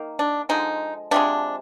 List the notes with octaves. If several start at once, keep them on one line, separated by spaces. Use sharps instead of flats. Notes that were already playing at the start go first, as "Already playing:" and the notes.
Already playing: D#3 A#3
D4
D3 F3 G#3 D#4
C3 F3 G#3 D4